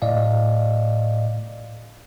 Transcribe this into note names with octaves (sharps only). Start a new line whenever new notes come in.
A2 D5 D#5 F5